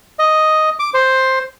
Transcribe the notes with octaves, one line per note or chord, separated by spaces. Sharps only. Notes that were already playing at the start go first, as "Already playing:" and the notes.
D#5
D6
C5